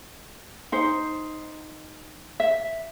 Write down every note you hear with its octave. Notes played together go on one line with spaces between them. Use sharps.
D#4 C5
E5